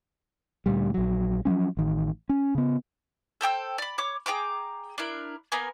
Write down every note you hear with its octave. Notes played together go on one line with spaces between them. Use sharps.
D2 A#2 G3
A#1 F#3
F3 F#3 G#3 C#4
A1 D#3
C#4
C#3 B3
A4 C5 G5 E6
D5 B5
C#5 D6
G#4 G5 A#5 D6
D4 E4 A#4
A#3 B3 A#4 G#5